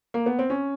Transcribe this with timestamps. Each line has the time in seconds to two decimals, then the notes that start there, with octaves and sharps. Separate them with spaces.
0.14 A#3
0.26 B3
0.39 C4
0.50 C#4